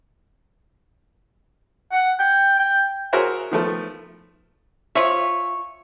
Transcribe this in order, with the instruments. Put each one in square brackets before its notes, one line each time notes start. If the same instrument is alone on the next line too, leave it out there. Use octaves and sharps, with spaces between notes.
[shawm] F#5
G5
G5
[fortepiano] F#4 G#4 A#4 C5 C#5 E5
D#3 F3 A3 B3
[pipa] F3 E5 [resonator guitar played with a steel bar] C#5